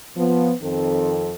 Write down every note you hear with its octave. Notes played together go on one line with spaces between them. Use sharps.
F3 B3
F2 D#3 C4 A4